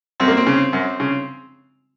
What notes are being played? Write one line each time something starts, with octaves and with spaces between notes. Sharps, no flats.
F#2 C4
A#3
C4
C#3
F#2
C#3